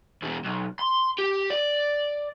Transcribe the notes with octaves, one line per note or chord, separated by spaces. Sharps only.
E2 B2
B1
C6
G4
D5